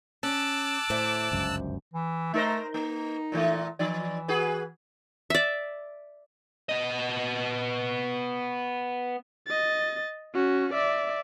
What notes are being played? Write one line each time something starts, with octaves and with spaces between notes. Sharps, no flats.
C#4 A5 D6 E6 F#6
D2 A2 C5 E5
G1 C#2 F#2
E3
A3 D#4 A#4 C5
A#3 D#4
A#2 E3 A3
E3 F3 D#4 D5
F#4 G#4 B4
D5 E5
B3 D#5
D#5 A6
C#4 F#4
D5 E5